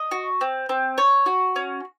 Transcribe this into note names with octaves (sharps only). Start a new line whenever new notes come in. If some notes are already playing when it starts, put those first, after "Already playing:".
Already playing: D#5
F#4
C4
C4
C#5
F#4
C#4